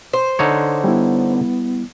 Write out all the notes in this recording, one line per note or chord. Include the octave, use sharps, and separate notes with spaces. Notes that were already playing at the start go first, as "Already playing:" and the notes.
C5
D3 D#4 C#5
G3 B3 E4